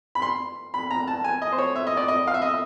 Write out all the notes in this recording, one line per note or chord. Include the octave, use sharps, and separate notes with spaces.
B5
C6
B5
A#5
A5
G#5
D#5
C5
C#5
E5
D#5
D5
D#5
F5
E5
D#5
E5